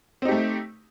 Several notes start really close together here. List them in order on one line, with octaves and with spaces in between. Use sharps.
C4 D#4 G4 A3